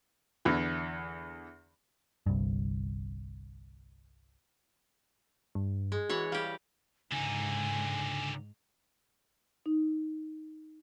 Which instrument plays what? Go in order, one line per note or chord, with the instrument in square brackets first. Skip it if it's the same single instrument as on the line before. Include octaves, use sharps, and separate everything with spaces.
[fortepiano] E2 D3 E3
[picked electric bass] G1 C2 G2
[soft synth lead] G2
[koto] G#3
[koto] E3 C#5 F#5 [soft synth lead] F#4
[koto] G3 G4 [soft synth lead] F5
[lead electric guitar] C#2 [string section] G#2 [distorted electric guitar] D3 D#4 [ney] G#5
[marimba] D#4